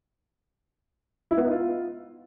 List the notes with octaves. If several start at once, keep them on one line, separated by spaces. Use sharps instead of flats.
E4
B3
D#4
F4